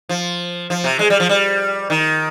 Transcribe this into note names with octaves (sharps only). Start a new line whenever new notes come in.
F3
F3
C3
G#3
G3
F3
G3
D#3